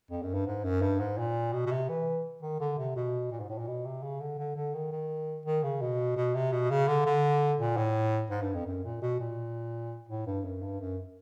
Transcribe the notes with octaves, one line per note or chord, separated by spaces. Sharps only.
F2
F#2
G2
G#2
F#2
G2
G#2
A#2
B2
B2
C3
E3
D#3
D3
C3
B2
A#2
G#2
A2
A#2
B2
C3
C#3
D3
D3
D3
D#3
D#3
D#3
C#3
B2
B2
C3
B2
C#3
D3
D3
A#2
A2
G#2
G2
F2
F#2
A#2
B2
A#2
A2
G2
F#2
G2
F#2